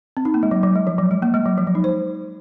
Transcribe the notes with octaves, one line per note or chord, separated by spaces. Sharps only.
C4
D#4
A#3
G#3
F#3
F#3
G#3
F3
F#3
G#3
A#3
G#3
F#3
F3
F#3
D#4
C5